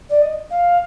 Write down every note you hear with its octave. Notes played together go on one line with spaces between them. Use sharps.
D5
D#5
F5